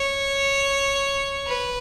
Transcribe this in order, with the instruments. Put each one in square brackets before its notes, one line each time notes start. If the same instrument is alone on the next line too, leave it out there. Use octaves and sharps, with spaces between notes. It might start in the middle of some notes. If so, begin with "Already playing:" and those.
Already playing: [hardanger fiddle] C#5
B4